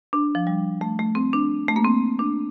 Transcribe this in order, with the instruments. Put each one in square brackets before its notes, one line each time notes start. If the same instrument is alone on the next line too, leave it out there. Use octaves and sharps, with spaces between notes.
[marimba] D4
F3
G3
A3
A3
C4
D4
A3
A#3
C4
D4